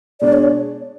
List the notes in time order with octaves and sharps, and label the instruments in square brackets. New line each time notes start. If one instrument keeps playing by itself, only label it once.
[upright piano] B2 G#3 D4 [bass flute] D5
[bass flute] C#5